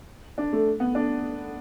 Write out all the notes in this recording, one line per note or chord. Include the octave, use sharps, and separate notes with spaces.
D4
A3
B3
D4